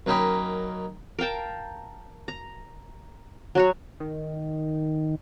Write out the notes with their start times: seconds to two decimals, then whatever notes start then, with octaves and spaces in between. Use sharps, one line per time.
0.06 F#2 A#3 C#4 D#4 G5 B5
1.19 A#4 F5 G5 A5
2.28 A#5
3.55 F#3 F#4 C#5
4.00 D#3